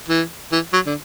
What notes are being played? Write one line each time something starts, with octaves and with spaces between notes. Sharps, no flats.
E3
E3
F#3
D3